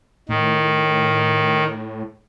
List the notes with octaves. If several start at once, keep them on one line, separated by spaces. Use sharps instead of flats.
A2 D#3